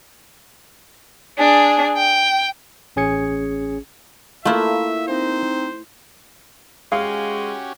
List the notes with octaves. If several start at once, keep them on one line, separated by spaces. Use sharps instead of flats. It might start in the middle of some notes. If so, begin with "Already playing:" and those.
D4 G#4
G5
A1 C#4 G#4 G#6 C#7
A3 A#3 E4 F4 E5
C4 D#4 C5
G#3 C#4 F#4 G4 F5